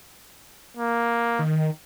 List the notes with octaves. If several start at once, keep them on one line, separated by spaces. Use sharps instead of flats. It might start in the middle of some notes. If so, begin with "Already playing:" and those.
A#3
D#3